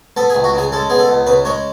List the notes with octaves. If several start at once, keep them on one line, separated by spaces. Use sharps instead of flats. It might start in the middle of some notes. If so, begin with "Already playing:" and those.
B3 A4
G#4
C#2
F#4
C#3 G#4
G#3 A4
B3 G#4
A4
C#2
C#3 B4
G#3 C#5